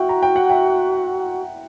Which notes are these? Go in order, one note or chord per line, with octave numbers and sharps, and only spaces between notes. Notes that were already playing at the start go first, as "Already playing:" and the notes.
Already playing: F#4 E5 F#5 G5
A#5
G5
F#5
E5 G5